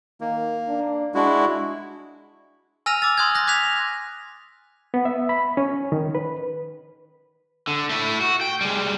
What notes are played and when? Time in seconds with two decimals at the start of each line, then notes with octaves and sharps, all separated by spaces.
0.21 D#3 A#3
0.69 D4
1.15 G#3 D4 E4 F#4
2.86 G#5 E6 F6 A#6 D#7 F7
3.02 D6 E6 A6
3.18 C6 D#6 F#6 G#6
3.35 F#6 A#6
3.47 D6 F#6 G#6 B6 F7
4.94 B3
5.05 E5
5.29 B5
5.57 C#4
5.92 D#3
6.15 B4
7.67 D3
7.89 A3 E4
8.21 F#4
8.41 G5
8.61 G3 G#3